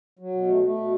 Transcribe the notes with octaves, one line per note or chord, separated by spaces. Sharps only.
F#3
B2
A3
A3
B2